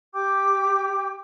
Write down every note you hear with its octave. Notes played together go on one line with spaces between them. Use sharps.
G4 G5 D6 G6